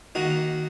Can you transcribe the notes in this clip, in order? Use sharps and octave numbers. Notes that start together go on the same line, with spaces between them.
D#3 A#3 D#4 F#4